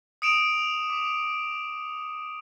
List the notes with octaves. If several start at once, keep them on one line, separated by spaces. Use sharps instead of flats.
D#6 C#7 D7 E7 F7
D6